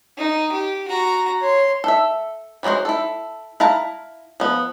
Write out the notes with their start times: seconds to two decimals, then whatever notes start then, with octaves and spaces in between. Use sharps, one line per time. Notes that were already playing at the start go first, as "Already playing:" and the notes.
0.17 D#4
0.52 G4
0.88 F#4 A#5
1.41 C#5 C6
1.84 A4 E5
2.63 E3 F#3 G#3 F#4 C5
2.85 E4 A4
3.60 E4 F5 A5 A#5
4.40 F3 B3